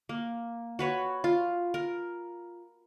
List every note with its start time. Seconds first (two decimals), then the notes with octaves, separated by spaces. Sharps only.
0.09 A#3
0.79 F#4 B4 C#5
1.24 F4
1.74 A#4